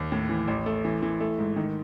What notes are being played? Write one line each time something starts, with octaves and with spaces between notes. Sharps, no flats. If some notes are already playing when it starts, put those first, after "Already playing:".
Already playing: D#2
A2
E3
A1
A3
E3
E3
A3
G#2
D#3